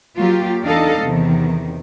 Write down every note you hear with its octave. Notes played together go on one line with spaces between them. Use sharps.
F#3 A#3 F4 G4
E2 D4 D#4 A4 D#5 F5
E2 C3 D#3